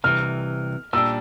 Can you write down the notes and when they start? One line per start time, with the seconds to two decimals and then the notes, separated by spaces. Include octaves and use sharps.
0.04 C2 C3 E3 F6
0.93 A#2 G3 D4 E6